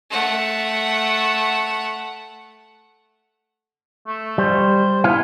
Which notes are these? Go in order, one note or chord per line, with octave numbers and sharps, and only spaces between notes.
A3 F#5
A3
G3 C5
B3 E4 F5